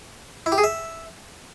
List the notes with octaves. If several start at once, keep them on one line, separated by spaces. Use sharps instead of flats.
E4
G4
G#4
E5